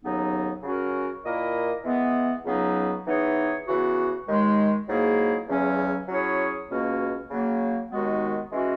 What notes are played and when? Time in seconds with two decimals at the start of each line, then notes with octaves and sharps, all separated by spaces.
0.02 D#2 C#3 F#3 B3 D#4
0.63 C#3 F#3 C#4 F#4 A#4
1.24 A#2 A#3 E4 A#4 D#5
1.84 E3 G#3 B3
2.45 C#2 C#3 F#3 B3 D#4
3.05 E3 B3 D#4 G#4 C#5
3.67 C#3 E3 B3 F#4
4.27 D#2 D#3 G#3
4.88 G#2 F#3 A#3 E4 G#4
5.48 E2 C#3 F#3 C#4
6.08 F#3 C#4 E4 G#4 C#5
6.69 C#2 B2 A#3 C#4 F#4
7.31 C#3 F#3 A#3
7.91 D#2 D#3 G#3 B3 F#4
8.52 E3 G#3 C#4 F#4